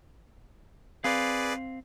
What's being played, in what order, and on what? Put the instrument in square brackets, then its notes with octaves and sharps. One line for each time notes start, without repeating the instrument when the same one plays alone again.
[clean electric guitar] C4 F5 [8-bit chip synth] G#4 B4 D5